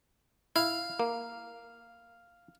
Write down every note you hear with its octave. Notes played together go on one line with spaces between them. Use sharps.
E4 F5
A#3